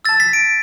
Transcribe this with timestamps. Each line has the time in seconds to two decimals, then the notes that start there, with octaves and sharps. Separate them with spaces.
0.05 A5 E6 A6
0.20 B6
0.33 D7